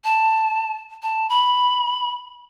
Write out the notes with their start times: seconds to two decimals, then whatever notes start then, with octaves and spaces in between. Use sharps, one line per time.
0.04 A5
1.03 A5
1.29 B5